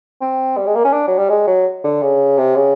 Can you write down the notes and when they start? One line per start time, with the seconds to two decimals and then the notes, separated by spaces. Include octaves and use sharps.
0.21 C4
0.57 G3
0.66 G#3
0.76 A#3
0.85 C#4
0.93 D4
1.08 F#3
1.18 G3
1.29 G#3
1.47 F#3
1.84 D3
2.03 C#3
2.38 C3
2.56 C#3